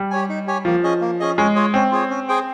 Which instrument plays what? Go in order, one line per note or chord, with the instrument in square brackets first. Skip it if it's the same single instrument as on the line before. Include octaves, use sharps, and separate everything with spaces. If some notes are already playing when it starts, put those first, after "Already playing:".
Already playing: [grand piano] G3
[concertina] G4 C#5 G#5
D#4
G4 C#5 G#5
[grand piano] F3 [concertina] A#3
[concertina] C#4 G#4 D#5
A#3
C#4 G#4 D#5
[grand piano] G#3 [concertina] C#4
[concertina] F4 G#4 C#5
[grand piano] C4 [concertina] C#4
[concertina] F4 G#4 C#5
C#4
G#4 C5 G5